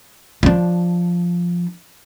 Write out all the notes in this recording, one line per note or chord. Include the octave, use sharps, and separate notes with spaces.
F3 D4